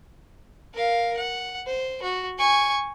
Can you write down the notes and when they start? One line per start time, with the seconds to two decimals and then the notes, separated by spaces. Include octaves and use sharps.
0.74 A#4 F5
1.17 F#5
1.66 C5
2.02 F#4
2.39 G#5 C#6